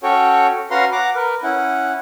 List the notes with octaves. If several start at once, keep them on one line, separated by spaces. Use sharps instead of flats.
C#4 F#4 A4 C#5 G5
C#4 F#4 B4 F5 A#5 C6
F#5 A#5 D6
A#4 B4
C#4 E4 F#5